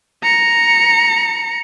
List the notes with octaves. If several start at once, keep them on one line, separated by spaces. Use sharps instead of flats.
A#5 C#7